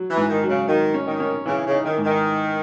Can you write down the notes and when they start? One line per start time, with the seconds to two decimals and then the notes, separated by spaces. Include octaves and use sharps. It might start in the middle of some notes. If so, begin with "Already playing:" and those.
Already playing: F#3
0.10 E3
0.17 G#2
0.30 D#3
0.43 F#3
0.49 C#3
0.68 D#3 F#3
0.94 C#4
1.07 D#3
1.20 C#4
1.46 C#3 E3
1.65 C#3
1.72 D#4
1.85 D#3
1.98 G#2
2.04 D#3